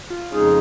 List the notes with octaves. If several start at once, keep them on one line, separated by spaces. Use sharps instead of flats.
F4
F2 C#3 G#3 C#4 D#4 G#4